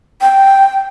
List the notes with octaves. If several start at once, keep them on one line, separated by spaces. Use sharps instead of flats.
G5